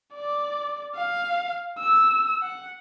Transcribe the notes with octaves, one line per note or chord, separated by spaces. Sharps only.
D5
F5
E6
F#5